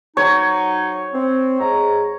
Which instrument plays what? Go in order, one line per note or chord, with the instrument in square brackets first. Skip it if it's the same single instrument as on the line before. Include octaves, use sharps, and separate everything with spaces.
[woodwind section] F#3 D#4 [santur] C#5
[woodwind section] C4
G#2 A#5